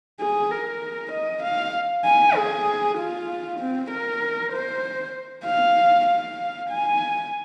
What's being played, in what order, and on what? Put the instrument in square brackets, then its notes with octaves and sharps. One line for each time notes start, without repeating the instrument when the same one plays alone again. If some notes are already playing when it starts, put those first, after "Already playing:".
[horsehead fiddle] G#4
A#4
D#5
F5
G#5
G#4
F4
C4
A#4
C5
F5
F5
G#5